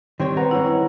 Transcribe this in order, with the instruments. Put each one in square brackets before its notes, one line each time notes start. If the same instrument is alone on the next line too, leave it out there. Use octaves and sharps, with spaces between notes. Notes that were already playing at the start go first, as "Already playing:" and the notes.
[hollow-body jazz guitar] D#3 C4 C#5 [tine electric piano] G3 G5 C6
[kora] B3 A#4 [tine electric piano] B4 A#5
[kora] G#3 C#4 [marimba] E4